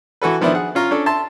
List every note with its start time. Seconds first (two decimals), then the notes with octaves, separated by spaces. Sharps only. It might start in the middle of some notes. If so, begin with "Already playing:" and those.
0.22 E3 F#4 A4 B4
0.41 D#3 F3 B3 D4 E4
0.54 G#4 F#5
0.75 C#4 F4 A#5
0.91 C#4 D4 A4
1.06 E5 A5 C6